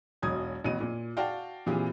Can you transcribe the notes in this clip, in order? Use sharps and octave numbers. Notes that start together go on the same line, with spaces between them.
E1 B1 F#3 D#6 G#6
A1 B2 D#7
A#2
F#4 D5 F5 G5 A5
A#2 E3 C4 F4 G4 G#4